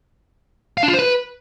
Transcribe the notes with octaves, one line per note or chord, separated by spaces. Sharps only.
F5
D4
F4
C5
B4